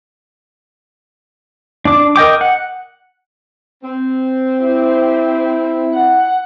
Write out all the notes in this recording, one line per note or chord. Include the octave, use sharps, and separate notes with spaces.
D4 D6
A#4 D#5 G5 D6
F#5
C4
E4 G4
F#5